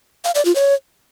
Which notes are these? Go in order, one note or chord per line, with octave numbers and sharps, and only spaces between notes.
F5
D5
F4
C#5